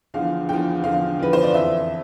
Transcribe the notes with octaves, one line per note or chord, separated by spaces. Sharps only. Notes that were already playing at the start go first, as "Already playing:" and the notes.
E2 D3 F3 F5
E2 D3 F3 G5
E2 D3 F3 F5
E2 D3 F3 B4
C5
D5
F2 E3 E5